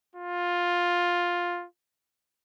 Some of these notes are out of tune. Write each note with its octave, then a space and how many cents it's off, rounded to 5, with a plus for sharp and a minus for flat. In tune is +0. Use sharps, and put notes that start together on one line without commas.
F4 +10